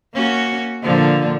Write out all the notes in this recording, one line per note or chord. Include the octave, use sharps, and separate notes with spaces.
A#3 C#4 F#4
A#2 D3 F3